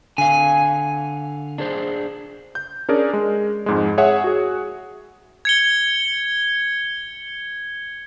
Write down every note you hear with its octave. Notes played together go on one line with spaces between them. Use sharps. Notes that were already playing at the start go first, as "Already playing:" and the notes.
D3 F5 G#5
D4 G#4 C5
G6
C#4 D4 G#4 A#4 D5
G#3
F2 G#2 G#3
G#4 C#5 E5 F#5
F#4 G#4
G#6 C#7 G7